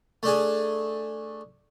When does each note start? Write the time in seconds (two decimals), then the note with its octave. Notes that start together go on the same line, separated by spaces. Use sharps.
0.23 A3 D4 G#4